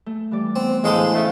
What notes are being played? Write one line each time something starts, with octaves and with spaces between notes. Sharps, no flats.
A3
E3 G3 D5
B3 C4
D2 A2 E3 G#3 A4 C5 F5
C#3 A3 D#5 F5 G5